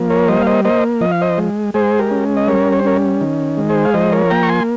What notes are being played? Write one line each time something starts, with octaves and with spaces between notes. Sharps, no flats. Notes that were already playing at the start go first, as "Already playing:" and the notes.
Already playing: F3 A#3
A#4 C#5
G3 C5 D#5
F5
C5 D#5
A#3 C5 D#5
F3 D#5
F5
C5 D#5
G#3
G#3 G#4 C5
G4 A#4
C#4
D#5
G3 A#4 C#5
C#5
C5
C#4 A#4 C#5
D#3
G#3
G#4 C5
F5
F3 C5 D#5
A#4 C#5
A#3 G5 A#5
C#6
G#5 C6